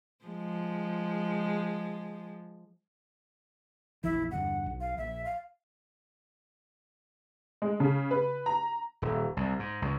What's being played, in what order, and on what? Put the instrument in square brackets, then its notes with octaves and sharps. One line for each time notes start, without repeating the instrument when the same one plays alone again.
[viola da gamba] F3 G#3
[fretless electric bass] F1 A#1 E3 [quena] E4
[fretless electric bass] E2 G2 D3 [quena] F#5
[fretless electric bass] B1
[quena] F5
[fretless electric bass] A#1 [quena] E5
[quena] F5
[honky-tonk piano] G#3
C#3
B4
A#5
[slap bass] D#1
C2
G#2
C#2